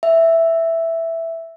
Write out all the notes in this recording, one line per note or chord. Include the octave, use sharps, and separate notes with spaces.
E5